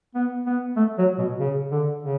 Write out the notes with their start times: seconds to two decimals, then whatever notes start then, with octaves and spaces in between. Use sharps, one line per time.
0.15 B3
0.46 B3
0.77 A3
0.98 F#3
1.18 B2
1.40 C#3
1.71 D3
2.03 C#3